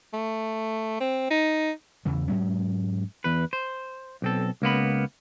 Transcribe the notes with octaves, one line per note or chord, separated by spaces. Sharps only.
A3
C4
D#4
E2 C#3 E3
G#2 F#3 G#3 C#4
E2 B4
C5
B1 C4 A4
C#2 A#3 B3 B5